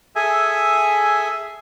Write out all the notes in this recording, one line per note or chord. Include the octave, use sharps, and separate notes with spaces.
G#4 A4 E5 G#5